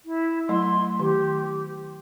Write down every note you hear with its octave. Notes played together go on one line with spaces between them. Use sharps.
E4
F#3 A3 E4 C6
D#3 G4